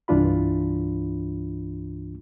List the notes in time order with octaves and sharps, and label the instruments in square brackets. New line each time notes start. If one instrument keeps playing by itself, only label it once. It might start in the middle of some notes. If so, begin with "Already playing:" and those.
[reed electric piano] C2 G2 E3 D4 F4 B5